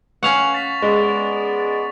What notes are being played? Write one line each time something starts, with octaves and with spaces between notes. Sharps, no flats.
C#4 F5 F#5 C#6 F7
A6 B6
G#3 B3 D5